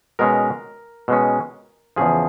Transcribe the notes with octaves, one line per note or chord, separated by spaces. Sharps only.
B2 G#3 C#4 A#4
B2 G#3 C#4
E2 C#3 F3 G#4